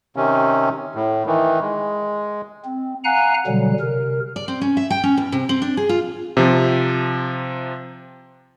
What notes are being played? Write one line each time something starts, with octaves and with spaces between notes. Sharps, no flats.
C3 D#3 C#4
A2
D#3 E3
G#3
C4
F5 F#5 G#5 A#5 F#6
B2 D3 F#3 G3
C3 A#4
D5
C4
C#4
E5
G5
C#4
E2
C3
C4
D4
G#4
F4
C3 F3